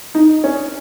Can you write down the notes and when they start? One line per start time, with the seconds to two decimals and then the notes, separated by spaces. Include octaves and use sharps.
0.15 D#4
0.44 C#4